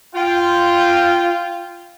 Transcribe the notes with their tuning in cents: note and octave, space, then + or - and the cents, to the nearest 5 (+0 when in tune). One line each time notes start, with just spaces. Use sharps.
F4 -10 G5 +0